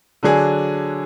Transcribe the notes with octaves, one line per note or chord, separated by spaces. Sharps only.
D3 F#3 D4 G#4